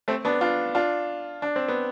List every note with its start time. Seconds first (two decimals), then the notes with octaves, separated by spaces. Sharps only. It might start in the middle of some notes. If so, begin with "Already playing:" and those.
0.08 A3 C4
0.25 B3 D4
0.41 D4 F4
0.75 D4 F4
1.42 D4
1.56 C4
1.68 B3